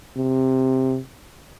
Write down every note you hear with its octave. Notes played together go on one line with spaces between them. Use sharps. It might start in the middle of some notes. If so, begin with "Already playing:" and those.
C3